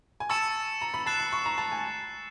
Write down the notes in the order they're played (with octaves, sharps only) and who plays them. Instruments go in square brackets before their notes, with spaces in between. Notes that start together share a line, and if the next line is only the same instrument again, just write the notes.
[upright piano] G#5
[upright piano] A5 [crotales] C#6 E6 A6 C#7 E7
[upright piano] A#5
B5
[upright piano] A5 [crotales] F#6 A6 C7 E7
[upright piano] B5
C#6
A#5
A5
G#5